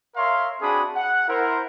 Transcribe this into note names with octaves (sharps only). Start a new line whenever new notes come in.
A#4 C#5 E5 F5 C6
C4 D4 F#4 G#4 B5 D#6
F#5
E4 A#4 C5